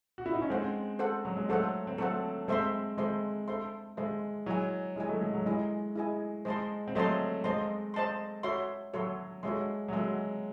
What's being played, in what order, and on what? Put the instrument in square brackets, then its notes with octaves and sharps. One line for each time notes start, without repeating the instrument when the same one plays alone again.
[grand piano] F#4
E4
D#4
C#4
[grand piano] G#3 C4 [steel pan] A4 C5 F#5
[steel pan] A4 C5 F#5
[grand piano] F#3
G#3
[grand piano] F#3 A3 [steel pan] A4 C5 F#5
[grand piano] C4
[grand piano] F#3 A3 [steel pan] A4 C5 F#5
[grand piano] G#3 C4 [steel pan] A4 C5 E5 C6
[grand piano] G#3 [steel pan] A4 C5 E5 C6
[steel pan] A4 C5 E5 C6
[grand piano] G#3 [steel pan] A4 C5 E5 C6
[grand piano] F#3 [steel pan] E4 G#4 D#5 G#5
[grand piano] G#3 [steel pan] E4 G#4 D#5 G#5
[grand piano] F#3 A3
G#3
F#3
[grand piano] G#3 [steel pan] E4 G#4 D#5 G#5
[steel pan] E4 G#4 D#5 G#5
[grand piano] G#3 [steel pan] C5 D#5 A5 C6
[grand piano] C4
[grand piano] F#3 A3 [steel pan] C5 D#5 A5 C6
[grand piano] G#3 [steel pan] C5 D#5 A5 C6
[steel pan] C5 D#5 A5 C6
F#4 A4 C#5 E5 C6
[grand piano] F#3 [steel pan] F#4 A4 C#5 E5 C6
[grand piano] G#3 [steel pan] F#4 A4 C#5 E5 C6
[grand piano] F#3
[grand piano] G#3 [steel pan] F#4 A4 C#5 E5 C6